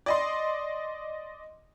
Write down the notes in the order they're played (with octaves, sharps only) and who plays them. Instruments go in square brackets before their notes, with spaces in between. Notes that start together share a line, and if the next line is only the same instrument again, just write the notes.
[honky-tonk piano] D5 D#5 C6